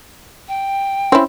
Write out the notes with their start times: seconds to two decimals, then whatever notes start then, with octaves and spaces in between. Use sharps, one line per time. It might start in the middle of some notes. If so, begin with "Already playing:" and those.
0.48 G5
1.12 C4 C#4 E4